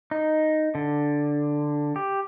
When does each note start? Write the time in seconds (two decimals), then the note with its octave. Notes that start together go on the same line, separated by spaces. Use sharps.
0.11 D#4
0.75 D3
1.96 G4